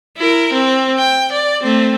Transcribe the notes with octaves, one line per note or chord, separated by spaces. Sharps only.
E4 A#4
C4
G5
D5
A3 C4